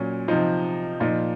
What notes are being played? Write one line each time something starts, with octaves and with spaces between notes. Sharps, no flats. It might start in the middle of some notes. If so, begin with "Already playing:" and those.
Already playing: A#2 F#3 C#4
C3 F3 D#4
A#2 F3 D#4